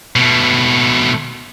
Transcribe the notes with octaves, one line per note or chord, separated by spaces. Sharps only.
B2 A3